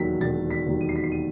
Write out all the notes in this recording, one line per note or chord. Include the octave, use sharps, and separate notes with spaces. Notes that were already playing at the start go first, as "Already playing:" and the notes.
Already playing: E1 D#2 D#3 F#3 B6
E1 A6
B6
D#2 D#3 F#3
D#7
C7
B6
C7
D#7